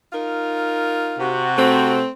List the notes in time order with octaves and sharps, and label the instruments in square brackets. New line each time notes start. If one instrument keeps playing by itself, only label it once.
[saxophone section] D#4 F4 A#4
[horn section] C3 F#4
[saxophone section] A3 C4